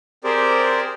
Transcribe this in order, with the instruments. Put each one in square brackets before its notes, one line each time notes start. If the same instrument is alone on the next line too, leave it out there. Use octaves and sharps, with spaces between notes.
[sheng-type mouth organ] C4 G4 G#4 A#4 C5 D5